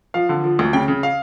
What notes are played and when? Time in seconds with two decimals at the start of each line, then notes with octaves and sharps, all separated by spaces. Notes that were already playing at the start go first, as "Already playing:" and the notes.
0.14 F3 F5
0.29 D3
0.44 F3
0.59 D2
0.73 C#3 G5
0.88 C#3
1.03 F5